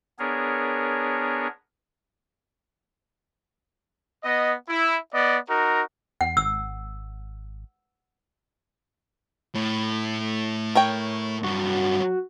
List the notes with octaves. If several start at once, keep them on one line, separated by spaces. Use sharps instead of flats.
B3 D4 G#4 A#4 C#5
B3 D#5
E4
B3 D5 D#5
D#4 F#4 A#4
E2 F#5
G#1 E6
A2
A#4 C#5 G5
G2 F#3 F#4